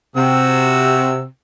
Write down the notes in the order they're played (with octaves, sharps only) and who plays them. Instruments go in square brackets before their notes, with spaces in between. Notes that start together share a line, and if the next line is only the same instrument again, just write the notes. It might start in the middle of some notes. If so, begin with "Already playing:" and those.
[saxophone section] C3 [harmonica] F#4 E6